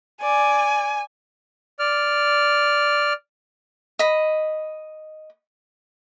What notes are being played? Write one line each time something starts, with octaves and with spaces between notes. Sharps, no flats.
D5 G#5
D5 F6
D#5 B5